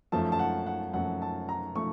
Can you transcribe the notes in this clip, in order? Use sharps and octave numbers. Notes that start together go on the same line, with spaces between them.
F#2 F3 A3 A5
A5
F#5
F#5
F#2 F3 A3 F#5
A5
A#5
F3 A3 C#6